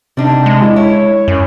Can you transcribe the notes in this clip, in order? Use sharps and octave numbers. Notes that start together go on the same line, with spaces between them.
C3 G3 D4 D#4
G#3
A#3 E4
E4 C#5
F#2